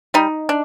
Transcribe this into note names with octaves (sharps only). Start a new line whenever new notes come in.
G3 D#4
D4